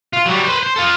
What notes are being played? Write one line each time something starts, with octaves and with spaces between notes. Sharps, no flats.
F4
F#3 G3
B4 C5
C5
F4 A4